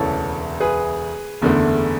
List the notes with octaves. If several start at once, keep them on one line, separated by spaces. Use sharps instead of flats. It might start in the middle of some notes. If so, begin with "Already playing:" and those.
Already playing: E1 D2 C#3 E3 A4 C#5
G#4 B4
F#1 E2 D3 A3